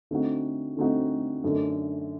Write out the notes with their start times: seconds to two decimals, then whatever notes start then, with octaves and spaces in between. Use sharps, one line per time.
0.11 D3 A3 C4 D#4 F#4
0.76 D3 A3 C4 D#4 F#4
1.44 F#2 D3 A3 D#4 A4